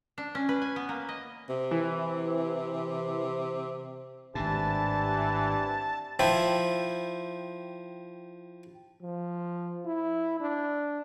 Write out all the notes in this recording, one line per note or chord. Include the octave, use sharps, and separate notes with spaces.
D4
C#4
B4
G#5
B3
A#3
D#5
C3
E3
G#1 A2 E3 C4 D4 G4 A5
F3 E4 G5
F3
E4
D4